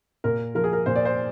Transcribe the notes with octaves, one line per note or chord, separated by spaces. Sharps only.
A#2 A#4
F3 A#4
G#4
A#4
A#2 C5
D5
C5